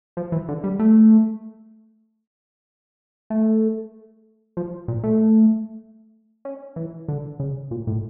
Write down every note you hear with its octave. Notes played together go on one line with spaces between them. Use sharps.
F3
E3
D3
G3
A3
A3
F3
A#2
A3
C#4
E3
D3
C#3
A#2
A2